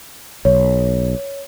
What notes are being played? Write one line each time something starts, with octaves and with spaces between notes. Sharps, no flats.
B1 C#5